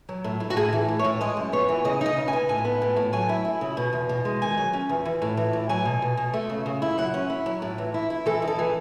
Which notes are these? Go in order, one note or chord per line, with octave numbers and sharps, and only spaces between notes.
F#3
A2
A2
F#4
A2 G#4
E3
A2
C#5
A2
G#3 D#5
F#2
B3 C#5
E3
C#3 D#5
D#4 D#5
C#3
G#5
B3
A2 G#5
B3
A2
A2
F#3 G#5
E4
E4
C#3
B2
E2
B2
G#3
D#3 G#5
F#3
C#4
E2
E3
A2
E3
A2
F#3 G#5
B2
B2
B2
A3
C#3
C#3
E4
F#3 F#5
C#4
E4
F#3
A2
E3
E4
E4
E3 A4
D#4
A4
E3